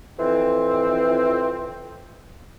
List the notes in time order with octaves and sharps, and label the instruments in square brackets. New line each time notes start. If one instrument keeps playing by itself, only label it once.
[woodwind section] F2 E3 C4